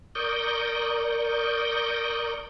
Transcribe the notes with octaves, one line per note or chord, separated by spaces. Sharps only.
A#4 D5 C#6 D#6 G6